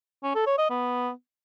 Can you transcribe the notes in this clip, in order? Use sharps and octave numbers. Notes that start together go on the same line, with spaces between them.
C#4
A4
C#5
D#5
B3